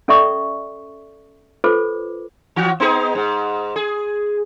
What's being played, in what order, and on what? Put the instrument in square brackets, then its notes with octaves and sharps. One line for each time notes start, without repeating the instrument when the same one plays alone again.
[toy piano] C#4 A4 D5 E5 C#6 D#6
F4 A4 B4 C5 D6
[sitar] E3 F#4
B3 D#4 G#4
G#2
G#4